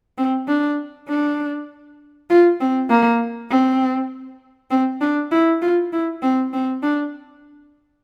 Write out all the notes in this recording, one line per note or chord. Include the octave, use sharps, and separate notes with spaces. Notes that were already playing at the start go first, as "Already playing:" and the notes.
C4
D4
D4
F4
C4
A#3
C4
C4
D4
E4
F4
E4
C4
C4
D4